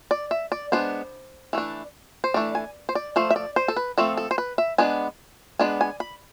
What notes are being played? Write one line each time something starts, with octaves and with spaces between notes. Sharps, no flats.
D5
E5
D5
G#3 B3 D4 C5
E3 A3 D4
C5
E3 A3 D4 D5
G#5
C5
D5
F3 A3 C5
E5
D5
C5
A4
B4
F3 A3 C4 A4
A4
C5
B4
E5
G#3 B3 D4 G#5
G#3 B3 D4 G#5
G#5
B5